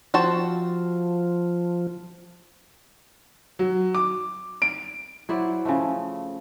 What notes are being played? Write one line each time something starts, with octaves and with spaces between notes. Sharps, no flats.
F3 C4 F#4 A5
F#3
D6
D7
F#3 E4 C5 D5
C#3 F3 A3